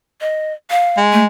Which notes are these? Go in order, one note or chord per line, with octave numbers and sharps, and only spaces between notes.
D#5
F5
G#3
A3